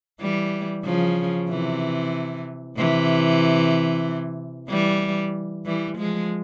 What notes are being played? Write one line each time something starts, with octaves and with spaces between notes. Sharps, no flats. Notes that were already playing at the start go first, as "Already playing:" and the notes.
E3 G3
C#3 F3
C3 E3
C3 E3
E3 G3
E3 G3
F3 G#3